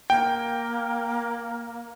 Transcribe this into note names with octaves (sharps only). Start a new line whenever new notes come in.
A#3 G5